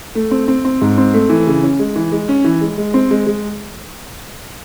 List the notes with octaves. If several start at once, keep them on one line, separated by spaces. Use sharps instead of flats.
A3
C4
C4
C4
G#2
C4
A3
E3
C#3
C#4
G#3
E3
G#3
C#4
E3
G#3
G#3
C4
G#3
G#3